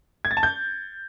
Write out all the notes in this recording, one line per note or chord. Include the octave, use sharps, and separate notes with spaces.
G#6
A6
A5
G6